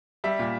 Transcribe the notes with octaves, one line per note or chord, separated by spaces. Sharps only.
G3 E5
A#2